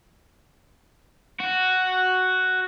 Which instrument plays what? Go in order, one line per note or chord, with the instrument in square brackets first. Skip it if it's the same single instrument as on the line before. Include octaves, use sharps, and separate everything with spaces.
[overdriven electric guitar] F#4